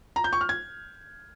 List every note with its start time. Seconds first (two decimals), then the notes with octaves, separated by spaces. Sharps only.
0.16 A#5
0.24 G6
0.33 C#6
0.41 F6
0.49 G#6